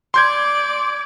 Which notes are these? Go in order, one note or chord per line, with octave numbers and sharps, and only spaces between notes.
D5 C6 G6 G#6